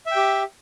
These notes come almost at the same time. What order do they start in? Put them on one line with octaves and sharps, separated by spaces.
E5 G5 G4